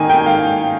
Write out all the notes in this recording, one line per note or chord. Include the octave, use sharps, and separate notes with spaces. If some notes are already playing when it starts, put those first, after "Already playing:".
Already playing: D#3 A#3 D#4 G#5
G5
F5